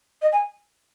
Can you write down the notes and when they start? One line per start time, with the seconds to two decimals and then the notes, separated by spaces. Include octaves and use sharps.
0.22 D#5
0.32 G#5